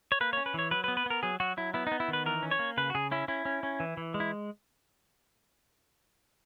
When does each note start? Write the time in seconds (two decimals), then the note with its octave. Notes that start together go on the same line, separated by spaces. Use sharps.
0.12 C#5
0.21 A#3 B4
0.33 C#5
0.37 C#4
0.46 B4
0.54 E3 C#5
0.71 F#3 B4
0.84 B4
0.88 B3
0.97 B4
1.06 B3 A#4
1.23 F#3 G#4
1.40 F#3 F#4
1.57 F#3 E4
1.74 B3 E4
1.87 D#4
1.91 B3
2.00 E4
2.08 D#3
2.13 B4
2.26 E3 A#4
2.42 C#4
2.51 C#5
2.59 A#3
2.77 C#3 B4
2.90 F#4
2.95 C#3 G#4
3.11 C#4 E4
3.28 C#4 E4
3.45 C#4
3.63 C#4
3.80 E3
3.97 E3
4.14 G#3
4.20 E4